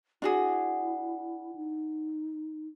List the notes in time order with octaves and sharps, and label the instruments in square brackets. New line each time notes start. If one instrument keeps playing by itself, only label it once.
[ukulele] D4 F#4 G#4 [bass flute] E4
[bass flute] D#4